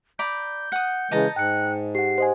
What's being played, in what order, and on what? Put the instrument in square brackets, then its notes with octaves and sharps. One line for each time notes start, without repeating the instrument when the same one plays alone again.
[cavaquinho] D5 A#5 B5 [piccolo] G6
[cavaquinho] F#5 D#6 [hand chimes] C#7
[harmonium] C#3 E3 G#3 [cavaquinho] D#5 A5 A#5
[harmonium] G#2 [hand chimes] G5 C#7 [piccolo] F#6
[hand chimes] G4 F#5 [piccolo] C7
[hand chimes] C5 D#5 G#5